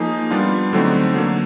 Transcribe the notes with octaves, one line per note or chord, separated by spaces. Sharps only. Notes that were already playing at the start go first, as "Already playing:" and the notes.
Already playing: F3 A#3 D#4 G#4
G3 B3 D4 F4
D3 F#3 A3 C4 D#4
D3 F#3 A#3